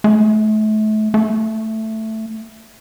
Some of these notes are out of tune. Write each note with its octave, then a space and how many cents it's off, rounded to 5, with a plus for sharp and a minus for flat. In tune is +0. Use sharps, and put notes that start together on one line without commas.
A3 -35
A3 +5